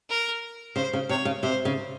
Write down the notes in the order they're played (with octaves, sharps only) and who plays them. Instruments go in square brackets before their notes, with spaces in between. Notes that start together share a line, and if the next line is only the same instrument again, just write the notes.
[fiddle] A#4
[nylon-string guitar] C#3 [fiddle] C5
[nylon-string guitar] C#3
[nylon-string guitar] C3 [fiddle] C#5
[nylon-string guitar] C#3
[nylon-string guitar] C3 [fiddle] C5
[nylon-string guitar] C#3